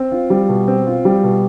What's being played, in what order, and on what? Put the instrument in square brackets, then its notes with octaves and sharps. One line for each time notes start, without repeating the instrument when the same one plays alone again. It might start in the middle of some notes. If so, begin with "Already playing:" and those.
Already playing: [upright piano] C4
F4
G3
B2
C4
F4
G3
B2